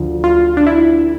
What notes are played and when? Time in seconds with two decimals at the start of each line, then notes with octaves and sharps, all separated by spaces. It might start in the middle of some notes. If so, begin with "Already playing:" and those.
Already playing: D2 D3 F3
0.24 F4
0.57 D4
0.67 E4